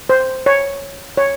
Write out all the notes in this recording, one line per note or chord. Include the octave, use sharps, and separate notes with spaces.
C5
C#5
C#5